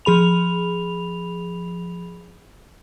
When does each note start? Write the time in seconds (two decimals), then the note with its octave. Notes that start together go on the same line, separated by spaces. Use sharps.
0.05 F3 G#4 B5 F7